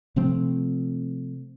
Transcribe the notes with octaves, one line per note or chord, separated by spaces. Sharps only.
C3 F3 A3 C4